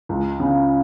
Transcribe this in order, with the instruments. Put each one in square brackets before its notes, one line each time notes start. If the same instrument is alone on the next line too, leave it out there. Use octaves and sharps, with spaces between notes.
[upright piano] C#2
C#3